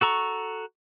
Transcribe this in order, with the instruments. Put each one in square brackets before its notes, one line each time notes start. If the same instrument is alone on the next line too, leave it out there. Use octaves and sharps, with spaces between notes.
[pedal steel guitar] F#4 A4 A#5 C#6